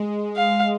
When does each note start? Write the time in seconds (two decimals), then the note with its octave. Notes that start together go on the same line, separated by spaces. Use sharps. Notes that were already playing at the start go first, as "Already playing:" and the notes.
Already playing: G#3
0.36 F5